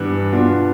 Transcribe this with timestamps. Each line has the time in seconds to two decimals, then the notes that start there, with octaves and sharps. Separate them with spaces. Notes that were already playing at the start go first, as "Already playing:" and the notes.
Already playing: G2 E3 B3 D4
0.32 B2 B3 D4 F4